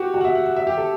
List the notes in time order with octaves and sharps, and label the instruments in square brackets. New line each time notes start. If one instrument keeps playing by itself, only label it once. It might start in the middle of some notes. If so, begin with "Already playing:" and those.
Already playing: [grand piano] F#4 G4
F#4
F#5
E5
F#5
F#5
E5
G4
A4